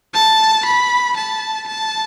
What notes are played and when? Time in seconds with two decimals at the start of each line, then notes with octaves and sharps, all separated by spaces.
0.14 A5
0.66 B5
1.17 A5
1.68 A5